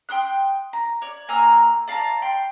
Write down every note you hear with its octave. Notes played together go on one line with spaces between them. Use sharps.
G5 C6 D#6 F#6
A#5
C#5 D5
A#3 G#5 A#5 E6
D5 F5 A5 A#5
G5 C6